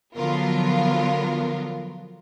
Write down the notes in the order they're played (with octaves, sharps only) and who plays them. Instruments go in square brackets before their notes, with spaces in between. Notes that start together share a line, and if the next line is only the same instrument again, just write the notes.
[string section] D3 F3 F#3 B3 F4 A#4